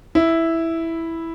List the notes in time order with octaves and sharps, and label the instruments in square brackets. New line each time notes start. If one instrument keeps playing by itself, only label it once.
[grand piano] E4